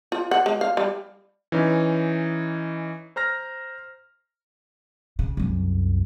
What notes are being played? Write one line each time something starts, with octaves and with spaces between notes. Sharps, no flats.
F4
F#5
G#3
F5
G3
E3 C#4 D#4
C5 A#5 F6 A#6
C#3
C2 F#2